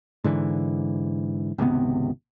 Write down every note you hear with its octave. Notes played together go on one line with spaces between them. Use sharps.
G#2 D3 E3
G#1 C#2 C3 B3